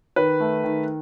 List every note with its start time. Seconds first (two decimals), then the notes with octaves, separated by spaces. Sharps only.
0.16 D#3 B4
0.40 A3
0.64 D#3